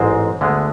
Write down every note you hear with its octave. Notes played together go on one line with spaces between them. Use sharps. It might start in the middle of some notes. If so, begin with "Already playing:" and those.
Already playing: A1 G#2 G#3 C4 C5
D2 D3 G#3 B3